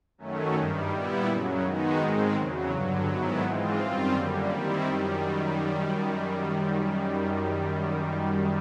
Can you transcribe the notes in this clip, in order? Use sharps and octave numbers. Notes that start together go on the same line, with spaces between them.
F#2 D#3 F#3 A3 C#4
G2 D#3 G3
A#2 G3 B3 E4
F#2 C#3 F#3
D#3 G#3 B3 D#4 F#4
G#2 D#3 G#3 C4
E2 C#3 F#3
G2 D3 F#3
G#2 D#3 F#3 B3 E4
G#2 E3 G#3 C4 F4
F#2 D#3 G3 C4 F4
F#2 D3 G3 A#3
D#3 G3 C4 E4
F#2 D#3 G3